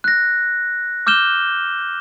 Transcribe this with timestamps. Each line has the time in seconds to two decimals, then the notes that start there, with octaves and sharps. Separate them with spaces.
0.04 F#6 A#6
1.07 D6 F6 G6 E7 G7